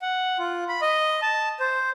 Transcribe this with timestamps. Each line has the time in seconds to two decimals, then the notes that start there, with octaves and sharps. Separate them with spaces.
0.02 F#5
0.39 F4
0.69 B5
0.82 D#5
1.22 A5
1.60 C5